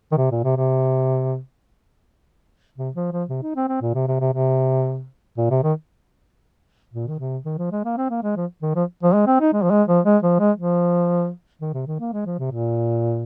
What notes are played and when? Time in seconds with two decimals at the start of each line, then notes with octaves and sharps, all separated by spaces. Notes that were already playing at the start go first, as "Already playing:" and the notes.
0.12 D#3
0.17 C3
0.31 A#2
0.44 C3
0.57 C3
2.78 C3
2.95 F3
3.12 F3
3.29 C3
3.43 D#4
3.56 C4
3.68 C4
3.81 A#2
3.94 C3
4.07 C3
4.20 C3
4.33 C3
5.37 A#2
5.50 C3
5.63 D#3
6.93 A#2
7.08 D#3
7.19 C3
7.45 D#3
7.58 F3
7.71 G#3
7.85 A#3
7.97 C4
8.10 A#3
8.23 G#3
8.36 F3
8.62 D#3
8.75 F3
9.03 F3
9.14 G#3
9.27 C4
9.40 D#4
9.53 G#3
9.62 F3
9.70 G#3
9.88 F3
10.05 G#3
10.22 F3
10.39 G#3
10.57 F3
11.61 D#3
11.74 C3
11.87 D#3
11.99 A#3
12.13 G#3
12.26 F3
12.39 C3
12.52 A#2